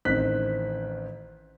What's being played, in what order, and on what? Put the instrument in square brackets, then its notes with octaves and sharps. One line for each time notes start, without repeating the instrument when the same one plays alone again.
[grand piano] A1 D#3 C4 F#6 B6